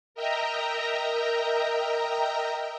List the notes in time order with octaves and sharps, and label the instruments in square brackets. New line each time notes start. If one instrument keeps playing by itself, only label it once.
[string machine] A#4 D#5 E5 G5 A#5